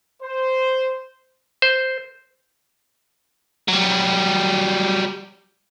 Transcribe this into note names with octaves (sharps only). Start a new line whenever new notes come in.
C5
C5
F#3 G3